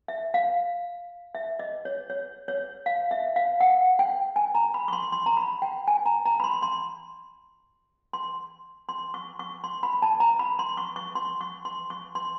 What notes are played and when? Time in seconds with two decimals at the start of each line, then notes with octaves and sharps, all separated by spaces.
0.08 E5
0.34 F5
1.35 E5
1.59 D#5
1.85 C#5
2.10 C#5
2.48 C#5
2.86 F5
3.11 E5
3.36 F5
3.60 F#5
3.99 G5
4.36 G#5
4.55 A#5
4.74 B5
4.88 C#6
4.93 C6
5.12 C6
5.26 A#5
5.37 B5
5.62 G5
5.88 G#5
6.06 A#5
6.25 A#5
6.40 B5
6.44 C6
6.62 C6
8.13 C6
8.89 C6
9.14 C#6
9.39 C#6
9.64 C6
9.83 B5
10.02 A5
10.20 A#5
10.39 B5
10.59 C6
10.77 C#6
10.96 C#6
11.15 C6
11.41 C#6
11.65 C6
11.90 C#6
12.15 C6